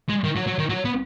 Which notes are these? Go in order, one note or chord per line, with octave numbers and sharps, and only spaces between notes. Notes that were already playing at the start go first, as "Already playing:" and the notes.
G#3
D#3
F#3
F#3
D#3
F#3
B3